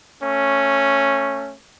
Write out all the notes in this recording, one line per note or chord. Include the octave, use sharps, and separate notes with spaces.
A3 C#4